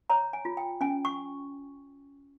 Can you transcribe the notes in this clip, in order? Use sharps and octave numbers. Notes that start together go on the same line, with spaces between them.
C#5 A#5
G#5
F4
G5
C#4 G#5
C#6